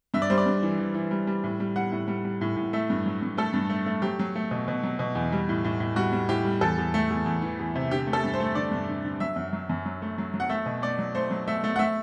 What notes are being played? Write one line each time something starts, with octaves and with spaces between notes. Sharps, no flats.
G2 E5
D5
G3 C5
D5
G2
E3
E3
E3
G3
G3
A2
G3
G3 F#5
A2
G3
G3
A2
A2
A3 E5
G2
F#3
G2
A3 A4
G2
A3
A3
F#3 G4
F#3
A3
B2
B2
F#3
B2
E2
G3
A2
A2
A2
G3 F#4
G3
A2 G4
G3
E2 A4
E2
A3
E2
E2
E3
E2
C3
D3 G4
A3
A4
G2
C5
A3
D3 D5
G2
D3
D3
F#3 E5
F#2
F#3
F#2
F#3
A3
F#3
F#3
F#5
A3 E5
B2
A3 D5
F#3
A3 C5
F#3
A3 E5
A3
F#5
A3 E5